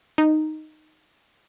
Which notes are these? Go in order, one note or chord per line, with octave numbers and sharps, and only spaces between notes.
D#4